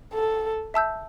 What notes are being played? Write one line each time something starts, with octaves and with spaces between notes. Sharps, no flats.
A4
E5 A5 E6 G6